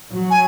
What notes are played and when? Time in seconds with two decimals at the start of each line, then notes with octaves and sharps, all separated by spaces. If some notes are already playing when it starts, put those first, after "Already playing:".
0.13 F#3
0.30 G#5